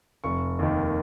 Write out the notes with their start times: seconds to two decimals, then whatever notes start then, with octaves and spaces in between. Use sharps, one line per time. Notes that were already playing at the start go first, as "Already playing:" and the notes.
0.24 F1 C#6
0.59 D#2 D#3